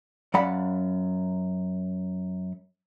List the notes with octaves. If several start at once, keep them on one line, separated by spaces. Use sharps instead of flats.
F#2 D5 F5 F#5 B5